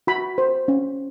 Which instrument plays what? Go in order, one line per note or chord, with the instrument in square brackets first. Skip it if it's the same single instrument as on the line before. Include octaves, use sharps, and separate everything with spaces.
[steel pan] F#4 B5
C5
C#4